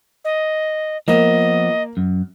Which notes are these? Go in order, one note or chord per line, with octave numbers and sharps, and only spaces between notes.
D#5
F3 A#3 B3 D#5
F#2